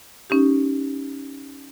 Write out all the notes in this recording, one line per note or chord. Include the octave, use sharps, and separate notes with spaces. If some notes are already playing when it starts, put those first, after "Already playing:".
C#4 D#4 G4